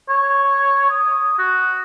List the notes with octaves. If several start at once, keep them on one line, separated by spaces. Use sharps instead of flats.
C#5
D#6
F#4